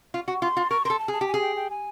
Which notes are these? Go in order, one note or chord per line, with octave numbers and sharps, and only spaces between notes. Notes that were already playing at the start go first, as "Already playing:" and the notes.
F4
F#4
F4 C6
F4
A#4 C#6
A4 A#4 C6
A5
G#4
A5
G4
G#5
G#4
G5
G5
G#5